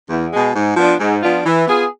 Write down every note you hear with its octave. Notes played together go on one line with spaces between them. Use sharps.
E2
B2 G#3
G#2
F3 B3 D4 F4
G#2
F3 B3 D4 F4
E3
B3 F4 G#4